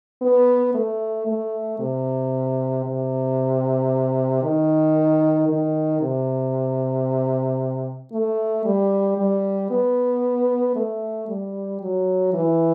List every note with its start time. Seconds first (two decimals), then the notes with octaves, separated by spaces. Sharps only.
0.22 B3
0.75 A3
1.27 A3
1.79 C3
2.85 C3
4.43 D#3
5.49 D#3
6.01 C3
8.12 A3
8.65 G3
9.18 G3
9.71 B3
10.76 A3
11.28 G3
11.81 F#3
12.34 E3